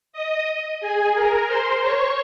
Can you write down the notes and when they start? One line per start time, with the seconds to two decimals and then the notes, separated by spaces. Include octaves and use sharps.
0.13 D#5 D#6
0.80 G#4 G#5
1.14 A#4 A#5
1.48 C5 C6
1.81 C#5 C#6